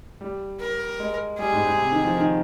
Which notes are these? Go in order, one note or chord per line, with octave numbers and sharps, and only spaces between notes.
G3
A#4
G#3
G3 G#4
G#2
G#2
C3
D#3
F3
D#3